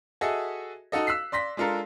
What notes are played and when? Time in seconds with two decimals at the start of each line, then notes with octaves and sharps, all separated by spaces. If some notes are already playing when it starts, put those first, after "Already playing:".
0.21 F#4 G#4 A4 D#5 E5
0.92 D#4 F#4 A4 D#5
1.07 E6 F#6 B6 C7
1.32 D5 C6 A#6 B6
1.57 G#3 D4 F4 A4 A#4